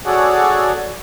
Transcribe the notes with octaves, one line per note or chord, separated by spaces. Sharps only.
F#4 G#4 A4 C#5 D5 F#5